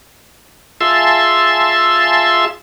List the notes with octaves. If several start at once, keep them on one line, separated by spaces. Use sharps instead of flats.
F4 G#4 E5 A5 C6 E6